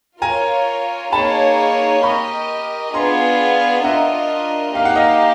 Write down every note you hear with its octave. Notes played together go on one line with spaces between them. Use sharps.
F4 A#4 C#5 G#5 A#5
A#3 D#4 G#4 C#5 A5 B5
G4 A#4 D#5 B5 C#6
B3 D4 F4 G#4 A#5 C6
D4 F4 A#4 D#5 E5 F#5
A#3 D#4 G4 F5
F#5
D#5 F5